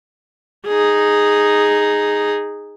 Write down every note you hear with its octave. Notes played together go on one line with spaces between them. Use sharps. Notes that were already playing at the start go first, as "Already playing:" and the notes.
D#4 G#4